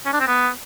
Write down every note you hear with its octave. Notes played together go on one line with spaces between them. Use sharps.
C#4
D4
C4
B3